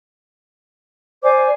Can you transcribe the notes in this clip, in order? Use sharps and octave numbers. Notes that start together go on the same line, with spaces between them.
C5 D5 G#5 D6